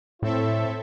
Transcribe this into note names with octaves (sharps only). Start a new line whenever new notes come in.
A2 C4 E4 A4 C#5 E5